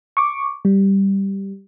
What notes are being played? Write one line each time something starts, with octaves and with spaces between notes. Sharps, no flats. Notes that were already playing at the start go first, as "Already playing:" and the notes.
C#6 D6
G3